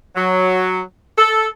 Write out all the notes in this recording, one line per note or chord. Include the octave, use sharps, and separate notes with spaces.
F#3
A4